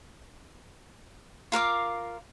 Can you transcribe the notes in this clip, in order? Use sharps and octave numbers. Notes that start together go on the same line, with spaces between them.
F4 A#4 F5 D6